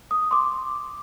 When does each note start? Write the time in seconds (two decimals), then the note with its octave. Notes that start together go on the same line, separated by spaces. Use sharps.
0.11 D#6
0.31 C6 D6